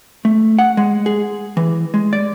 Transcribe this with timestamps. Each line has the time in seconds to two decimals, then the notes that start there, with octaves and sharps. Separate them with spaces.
0.25 A3
0.59 F#5
0.77 G#3
1.06 G#4
1.57 E3
1.94 G#3
2.13 D5